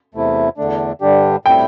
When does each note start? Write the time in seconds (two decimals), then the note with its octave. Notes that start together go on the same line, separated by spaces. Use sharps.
0.14 E2 C3 A3 E4
0.57 E2 D3 A3 D4
1.01 G2 D3 G3 D4 G4
1.45 A2 G3 C4 E4 G5